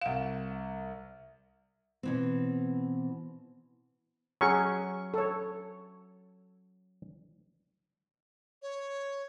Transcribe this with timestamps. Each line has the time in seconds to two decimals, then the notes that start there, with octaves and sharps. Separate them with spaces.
0.01 C2 F5 F#5 E7
2.03 B2 E3 C4
4.41 F#3 C#4 G#4 C#6
5.14 A4 C#5
8.62 C#5